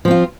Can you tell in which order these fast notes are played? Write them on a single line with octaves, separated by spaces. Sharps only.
F3 C4 F4